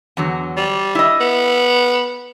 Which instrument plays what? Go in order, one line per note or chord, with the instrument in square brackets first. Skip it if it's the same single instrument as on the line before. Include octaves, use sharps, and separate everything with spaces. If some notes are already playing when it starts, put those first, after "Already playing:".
[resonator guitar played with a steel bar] E2 D3 F#3
[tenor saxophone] G3
[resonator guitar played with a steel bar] E4 D#5
[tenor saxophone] B3